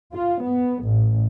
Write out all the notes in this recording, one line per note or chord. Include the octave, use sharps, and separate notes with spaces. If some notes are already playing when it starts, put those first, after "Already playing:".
F4
B3
A1